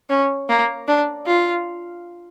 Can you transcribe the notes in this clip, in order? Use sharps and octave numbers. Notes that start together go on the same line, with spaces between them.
C#4
A#3
D4
F4